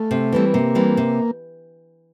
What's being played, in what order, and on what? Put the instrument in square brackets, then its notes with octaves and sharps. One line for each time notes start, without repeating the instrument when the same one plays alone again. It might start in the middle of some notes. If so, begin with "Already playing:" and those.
Already playing: [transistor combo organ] A3
[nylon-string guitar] C3
E3 G3 C4
[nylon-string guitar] C3 [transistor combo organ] A#3
[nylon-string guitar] E3 G3 C4
C3